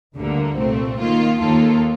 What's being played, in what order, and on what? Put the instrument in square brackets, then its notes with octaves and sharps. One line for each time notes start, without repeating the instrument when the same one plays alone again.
[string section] D2 D3 G3 A#3
C2 A#2 A3 C4
D#3 A#3 F4
D#2 D#3 A#3 F4 A4